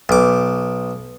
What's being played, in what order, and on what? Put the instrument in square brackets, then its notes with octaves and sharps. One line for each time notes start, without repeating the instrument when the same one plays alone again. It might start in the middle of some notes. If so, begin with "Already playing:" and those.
[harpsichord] B1 D6